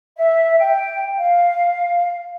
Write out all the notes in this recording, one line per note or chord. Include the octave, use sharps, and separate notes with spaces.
E5
G5
F5